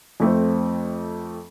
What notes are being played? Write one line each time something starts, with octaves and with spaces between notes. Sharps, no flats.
F2 A3 C4